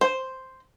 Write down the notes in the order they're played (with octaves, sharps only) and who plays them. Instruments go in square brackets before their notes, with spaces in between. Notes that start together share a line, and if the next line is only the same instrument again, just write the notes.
[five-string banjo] C5